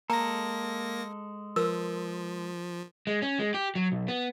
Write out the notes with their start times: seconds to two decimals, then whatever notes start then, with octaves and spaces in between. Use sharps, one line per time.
0.10 G#3 A#3 A4 A#5 A#6
1.56 F3 A#4 B4 E6
3.07 G#3
3.22 C#4
3.39 G#3
3.54 G4
3.75 F#3
3.92 B1
4.08 B3